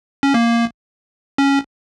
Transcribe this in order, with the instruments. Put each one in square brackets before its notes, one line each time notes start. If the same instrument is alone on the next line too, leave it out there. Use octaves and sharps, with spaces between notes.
[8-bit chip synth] C#4
A#3
C#4